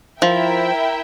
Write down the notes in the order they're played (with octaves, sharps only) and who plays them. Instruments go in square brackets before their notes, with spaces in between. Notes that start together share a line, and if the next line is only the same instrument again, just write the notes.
[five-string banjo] F3 [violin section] E4 A#4 E5 G5